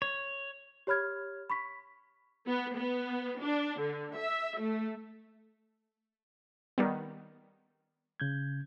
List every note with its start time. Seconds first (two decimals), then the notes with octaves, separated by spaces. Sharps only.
0.02 C#5
0.87 G4 C#5 B5 F6 G#6
1.50 B5 C#6 B6
2.47 B3
2.76 B3
3.41 D4
3.79 D3
4.16 E5
4.59 A3
6.78 D#3 G3 B3
8.20 C#3 G6 G#6